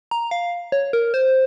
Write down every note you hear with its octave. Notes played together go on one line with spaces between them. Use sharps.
A#5
F5
C#5
A#4
C5